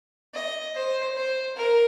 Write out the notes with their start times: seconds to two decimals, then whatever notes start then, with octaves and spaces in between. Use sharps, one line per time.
0.34 D#5
0.75 C5
1.16 C5
1.56 A#4